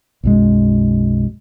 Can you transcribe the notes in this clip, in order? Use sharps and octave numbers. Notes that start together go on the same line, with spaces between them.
B1 F#2 G#3